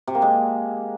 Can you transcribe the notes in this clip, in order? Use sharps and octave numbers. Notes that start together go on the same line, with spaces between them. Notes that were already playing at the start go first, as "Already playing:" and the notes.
C3
A#3
G#3